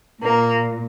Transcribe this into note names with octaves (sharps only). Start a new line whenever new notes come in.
A#2 A#3